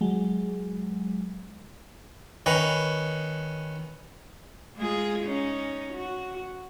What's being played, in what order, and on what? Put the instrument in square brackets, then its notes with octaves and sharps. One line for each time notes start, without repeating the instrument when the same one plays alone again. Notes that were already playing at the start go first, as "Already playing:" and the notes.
[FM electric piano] F#3 G#3
[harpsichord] D#3 C#4 B4
[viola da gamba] G#3 F4 G#4
C#4 D#4
F#4